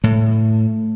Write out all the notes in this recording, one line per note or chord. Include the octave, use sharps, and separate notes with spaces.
A2 A3